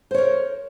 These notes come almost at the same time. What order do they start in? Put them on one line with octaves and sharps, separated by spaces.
C5 C#5 A#4